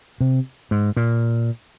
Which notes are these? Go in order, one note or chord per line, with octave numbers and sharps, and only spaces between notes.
C3
G#2
A#2